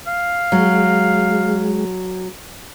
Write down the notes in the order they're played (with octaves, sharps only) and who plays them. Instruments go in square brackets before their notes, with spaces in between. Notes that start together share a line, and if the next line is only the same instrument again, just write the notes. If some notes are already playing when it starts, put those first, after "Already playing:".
[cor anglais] F5
[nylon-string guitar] F#3 [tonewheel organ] G#3